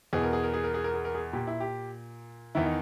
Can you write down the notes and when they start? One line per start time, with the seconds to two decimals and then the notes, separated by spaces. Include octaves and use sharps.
0.13 E2 B2 G#4
0.23 A#4
0.33 G#4
0.43 A#4
0.54 G#4
0.64 A#4
0.74 G#4
0.84 A#4
0.94 G#4
1.05 A#4
1.15 G#4
1.33 A#2 G4
1.47 E4
1.60 G4
2.55 E2 D#3 E4
2.66 D#4